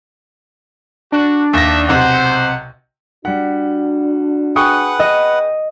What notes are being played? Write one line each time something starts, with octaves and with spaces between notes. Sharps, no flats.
D4 F#4
D#2 E5 A#6
B1 C3 C5 F#5
G3 D4 F#4 F#5 B6
G#4 B4 F#5 G5 C#6 D#6 C#7
D#5